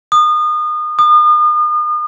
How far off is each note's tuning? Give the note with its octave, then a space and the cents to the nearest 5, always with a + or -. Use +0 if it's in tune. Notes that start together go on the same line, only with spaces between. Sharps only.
D#6 -30
D#6 -40